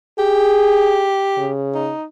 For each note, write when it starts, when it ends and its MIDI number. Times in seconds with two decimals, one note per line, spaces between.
0.19 1.51 67
0.19 1.07 68
1.38 1.92 49
1.75 2.04 63